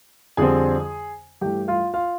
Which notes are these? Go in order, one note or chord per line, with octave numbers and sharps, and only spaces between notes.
F2 D3 G3 C4 G#4 G#5
G2 E3 A3 G4 G5
F4 F5
F4 F5